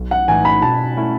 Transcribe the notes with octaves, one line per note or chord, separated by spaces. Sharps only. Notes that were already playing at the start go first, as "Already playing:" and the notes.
Already playing: B1
F#5
A2 E3 A3 D#4 G#5
B5
B2 A5
A3 C#4 E4